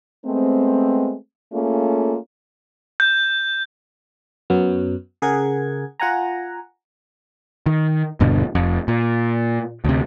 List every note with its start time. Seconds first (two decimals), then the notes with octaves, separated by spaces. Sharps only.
0.25 G#3 A3 B3 C4
1.52 A3 A#3 C#4 F4 G#4 A4
3.00 G6
4.50 F#2 F#3 B3
5.22 C#3 G#4 A#4 F#5 G#6
6.00 F4 F#5 G#5 A#5
7.66 D#3
8.20 D#1 G2 B2 D3
8.55 F1 F2
8.88 A#2
9.85 D2 C3